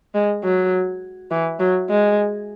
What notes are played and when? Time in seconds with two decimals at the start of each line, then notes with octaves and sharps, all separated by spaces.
0.14 G#3
0.44 F#3
1.31 E3
1.60 F#3
1.89 G#3